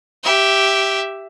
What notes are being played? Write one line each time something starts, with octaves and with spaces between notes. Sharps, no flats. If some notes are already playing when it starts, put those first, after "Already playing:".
G4 E5